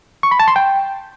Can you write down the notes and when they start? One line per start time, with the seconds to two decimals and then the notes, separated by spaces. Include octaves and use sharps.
0.23 C#6
0.31 B5
0.40 A5
0.48 C6
0.56 G5